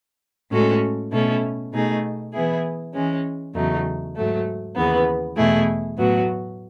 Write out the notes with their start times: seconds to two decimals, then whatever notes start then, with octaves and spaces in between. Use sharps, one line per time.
0.51 A2 G#3 C#4 F#4 A4
1.12 B2 A3 C#4 E4 A4
1.72 B2 A3 D#4 G#4
2.34 E3 B3 E4 G#4
2.94 E3 G#3 C#4
3.55 E2 C#3 F#3 A3 D#4
4.15 G#2 F#3 A3
4.76 D#2 C#3 E3 B3
5.37 E2 B2 A3 E4 G#4
5.97 A2 F#3 B3 F#4